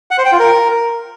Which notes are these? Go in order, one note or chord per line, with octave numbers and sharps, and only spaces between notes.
F#5
C5
G5
F4
A#4